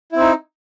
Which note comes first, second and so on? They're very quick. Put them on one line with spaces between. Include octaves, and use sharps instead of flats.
E4 C4 D#4